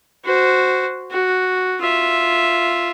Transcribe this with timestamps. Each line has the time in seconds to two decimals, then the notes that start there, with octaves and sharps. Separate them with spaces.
0.25 F#4 C5
1.11 F#4
1.81 F4 E5